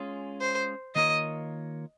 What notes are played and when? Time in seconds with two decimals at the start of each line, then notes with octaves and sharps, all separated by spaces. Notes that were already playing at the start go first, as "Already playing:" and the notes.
Already playing: G#3 C#4 F4 G#4
0.41 C5
0.96 D#3 A#3 F4 A#4 C#5 D#5